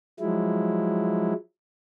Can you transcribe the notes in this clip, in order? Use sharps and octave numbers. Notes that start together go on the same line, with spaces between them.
F3 F#3 G#3 E4